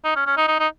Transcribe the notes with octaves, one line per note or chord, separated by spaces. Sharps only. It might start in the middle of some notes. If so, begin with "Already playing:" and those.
D#4
C#4
C#4
D#4
D#4
D#4